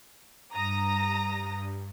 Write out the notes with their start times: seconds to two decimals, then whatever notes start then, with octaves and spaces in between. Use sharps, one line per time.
0.54 G2 A#5 D#6 A#6